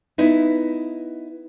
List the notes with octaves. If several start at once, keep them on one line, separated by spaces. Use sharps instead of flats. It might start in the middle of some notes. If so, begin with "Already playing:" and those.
B3 D#4 E4